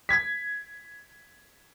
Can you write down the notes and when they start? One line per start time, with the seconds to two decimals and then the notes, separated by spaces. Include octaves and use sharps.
0.09 G#6 B6